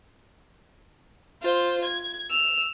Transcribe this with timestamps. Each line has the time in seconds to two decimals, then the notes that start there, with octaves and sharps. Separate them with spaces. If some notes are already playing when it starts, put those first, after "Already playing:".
1.42 F4 C5
1.84 G#6
2.30 E6 F7